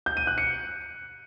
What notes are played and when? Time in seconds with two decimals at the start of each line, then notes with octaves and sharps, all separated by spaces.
0.06 G6
0.17 D#7
0.27 F#6
0.38 C#7